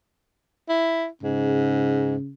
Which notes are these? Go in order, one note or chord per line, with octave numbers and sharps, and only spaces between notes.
E4
G#2 C#3